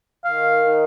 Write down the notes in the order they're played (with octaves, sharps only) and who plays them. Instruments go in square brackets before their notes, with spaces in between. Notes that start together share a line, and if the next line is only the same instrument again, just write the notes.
[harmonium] D#3 [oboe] F5
[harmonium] D#4